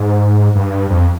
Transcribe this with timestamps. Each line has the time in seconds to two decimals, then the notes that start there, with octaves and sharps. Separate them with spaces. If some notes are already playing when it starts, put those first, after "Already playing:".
Already playing: G#2
0.56 G2
0.90 F2